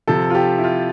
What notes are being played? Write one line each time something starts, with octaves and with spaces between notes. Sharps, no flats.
C3 F3 A4
F4
G4
E4
F4